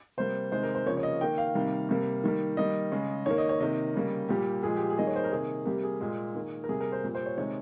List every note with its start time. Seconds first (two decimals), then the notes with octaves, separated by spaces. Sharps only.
0.17 C3 G3 A#3 C5
0.52 C3 D#3 G#3 C5
0.63 A#4
0.75 C5
0.86 C#3 F3 A#3 C#5
0.97 C#5
1.03 D#5
1.21 D#3 A#3 G5
1.38 F5
1.55 C3 D#3 G3 A#3
1.89 C3 G3 A#3
2.24 D#3 G3 A#3
2.57 D#3 G3 A#3 D#5
2.92 C#3 G#3
3.26 D#3 A#3 C#5
3.38 D#5
3.49 C#5
3.60 C3 D#3 A#3 D#5
3.94 C#3 G3 A#3
4.29 A#2 G3 A#3 G4
4.63 A#2 F3 G#3 G#4
4.77 G4
4.90 G#4
4.98 D#3 G3 A#3 D#5
5.07 C#5
5.15 C5
5.24 A#4
5.32 C3 D#3 A#3 G#4
5.66 C3 G3 A#3 G4
5.83 G#4
6.00 A#2 G#3
6.35 D#3 A#3
6.64 A#4
6.69 C3 G3 A#3 G#4
6.81 A#4
6.92 C5
7.04 A#2 G3 A#3
7.15 C5
7.26 C#5
7.37 C3 D#3 G#3 C#5